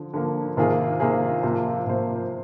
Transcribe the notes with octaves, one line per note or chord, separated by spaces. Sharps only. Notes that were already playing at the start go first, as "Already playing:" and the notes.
Already playing: D3 F3
D3 F3 A#3
C3 D#3 A#3 F4 G#4
C3 D#3 A#3 F4 G#4
C3 F3 A#3 F4 C5
C3 F3 A#3 F4 C5